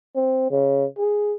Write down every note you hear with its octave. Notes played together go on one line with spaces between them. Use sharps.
C4
C#3
G#4